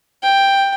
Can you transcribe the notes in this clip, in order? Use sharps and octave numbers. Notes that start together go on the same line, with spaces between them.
G5